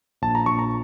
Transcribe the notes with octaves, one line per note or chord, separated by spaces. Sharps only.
A#1 A5
A#5
A#1 C#6
A#5